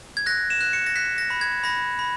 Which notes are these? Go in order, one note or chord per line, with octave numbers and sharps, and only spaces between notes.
G#6
F#6 A#6
E7
F#6
C#7
A#6
F#6 B6
A#6
B5
G#6
B5 A#6
B5